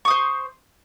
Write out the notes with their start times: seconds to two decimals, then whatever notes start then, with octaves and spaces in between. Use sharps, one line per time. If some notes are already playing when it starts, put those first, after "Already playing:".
0.05 C#6
0.08 D#6
0.10 C5